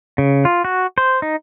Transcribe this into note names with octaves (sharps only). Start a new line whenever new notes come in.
C#3
F4
F#4
C5
D#4